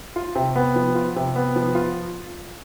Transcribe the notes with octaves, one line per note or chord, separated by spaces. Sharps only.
F4
C3
B3
F3
F4
C3
B3
F3
F4